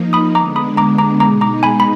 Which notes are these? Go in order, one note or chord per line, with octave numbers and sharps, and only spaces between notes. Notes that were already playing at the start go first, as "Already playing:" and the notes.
Already playing: F3 A#3 D#4
B5 D#6
D3 G#3 B3 D4 A#5 D6
B5 D#6
A#5 D6
A#5 D6
B2 G#3 D#4 A#5 D6
A#5 D6
G#5 B5
B5